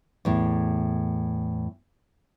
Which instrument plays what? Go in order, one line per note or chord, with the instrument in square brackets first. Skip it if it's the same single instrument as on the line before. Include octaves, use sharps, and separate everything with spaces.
[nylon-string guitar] E2 A2